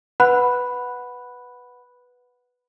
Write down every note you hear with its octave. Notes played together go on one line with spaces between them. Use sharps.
B4 F#5 B5 F#6